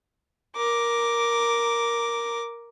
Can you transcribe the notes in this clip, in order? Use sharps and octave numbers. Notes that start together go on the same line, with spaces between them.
A#4 D6